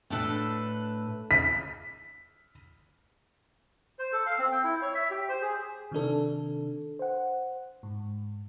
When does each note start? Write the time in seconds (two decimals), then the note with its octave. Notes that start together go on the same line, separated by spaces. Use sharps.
0.10 A2 D4 A4 B4 A5
1.31 B6
3.99 C5
4.12 A4
4.26 F5
4.39 C4
4.52 G5
4.64 E4
4.82 C#5
4.95 E5
5.11 G4
5.29 C5
5.41 G#4
5.92 C3 D#3 D4 A4
6.99 C5 F#5
7.83 G#2